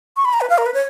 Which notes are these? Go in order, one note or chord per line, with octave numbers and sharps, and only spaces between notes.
C#6
B5
A#5
B4
F5
A#4
B4
C#5